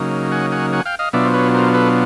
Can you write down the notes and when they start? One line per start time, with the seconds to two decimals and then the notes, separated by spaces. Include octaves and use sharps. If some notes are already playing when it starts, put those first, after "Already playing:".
Already playing: C#3 F#3 A#3 D#4
0.32 F#5 G#5
0.52 F#5 G#5
0.73 F#5 G#5
0.86 F5 G5
0.99 D#5 F5
1.13 B2 F#3 B3 D4 F4 D5 E5
1.25 C5
1.34 B4 C#5
1.54 A#4 C5
1.74 A4 B4